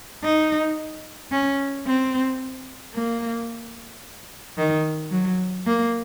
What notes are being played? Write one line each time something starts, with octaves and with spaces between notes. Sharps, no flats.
D#4
C#4
C4
A#3
D#3
F#3
A#3